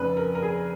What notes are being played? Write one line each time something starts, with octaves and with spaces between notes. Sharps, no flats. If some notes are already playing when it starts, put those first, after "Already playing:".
Already playing: F1 F2 C#3 B4
A#4
A#4
G#4